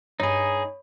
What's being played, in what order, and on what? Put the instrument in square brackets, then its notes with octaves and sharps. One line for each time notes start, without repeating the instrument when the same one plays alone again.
[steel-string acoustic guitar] G2 D#5 [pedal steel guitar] D#4 G#4 [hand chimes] C#5 B5